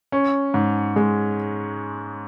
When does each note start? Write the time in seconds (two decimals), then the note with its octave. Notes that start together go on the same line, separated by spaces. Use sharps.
0.12 C#4
0.54 G#2
0.96 G#3